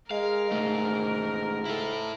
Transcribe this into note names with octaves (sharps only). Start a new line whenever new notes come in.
G#3 A#4 F5
C#2 G#2 A3
E4 A4